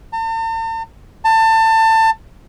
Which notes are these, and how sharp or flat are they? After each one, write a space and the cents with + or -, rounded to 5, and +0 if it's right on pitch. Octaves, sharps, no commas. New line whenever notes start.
A5 +45
A5 +25